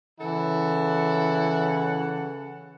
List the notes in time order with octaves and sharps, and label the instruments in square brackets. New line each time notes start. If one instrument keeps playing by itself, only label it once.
[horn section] C#3 A4 F#5 [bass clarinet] E3 [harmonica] E4